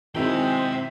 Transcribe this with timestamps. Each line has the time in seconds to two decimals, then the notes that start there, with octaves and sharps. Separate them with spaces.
0.15 D#3 F#3 G#3 C4 E4 E5 G5